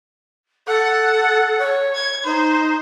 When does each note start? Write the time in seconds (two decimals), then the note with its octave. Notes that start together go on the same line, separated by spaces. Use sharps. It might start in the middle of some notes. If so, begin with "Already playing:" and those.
0.67 A4 F#5
1.58 C#5
1.94 G#6
2.24 D#4 C5